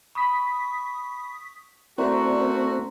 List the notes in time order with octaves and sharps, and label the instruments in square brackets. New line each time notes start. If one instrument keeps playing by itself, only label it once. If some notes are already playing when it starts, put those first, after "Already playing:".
[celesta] B5 [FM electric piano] C#6 D#6 B6
[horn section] A3 F#4 [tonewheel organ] C4 [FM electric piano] E4 A#4 D5 [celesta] A#5 C6